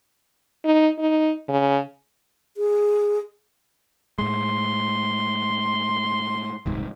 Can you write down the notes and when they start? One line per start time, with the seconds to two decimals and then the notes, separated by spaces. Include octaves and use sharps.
0.65 D#4
0.99 D#4
1.49 C#3
2.57 G#4
4.19 A2 G#3 C6
6.66 D#1 C2 G#2